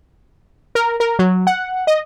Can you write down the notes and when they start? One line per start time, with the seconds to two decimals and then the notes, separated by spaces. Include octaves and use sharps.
0.75 A#4
1.00 A#4
1.19 F#3
1.47 F#5
1.87 D#5